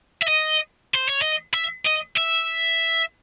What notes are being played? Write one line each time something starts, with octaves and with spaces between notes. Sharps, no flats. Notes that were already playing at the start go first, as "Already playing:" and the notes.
E5
D#5
C5
C#5
D#5
E5
D#5
E5